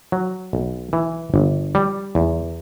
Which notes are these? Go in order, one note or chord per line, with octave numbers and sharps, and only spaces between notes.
F#3
B1
E3
G1
G3
E2